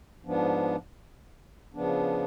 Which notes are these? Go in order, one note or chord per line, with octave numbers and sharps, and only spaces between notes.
G#2 F3 B3 D4
C#3 F3 B3 D4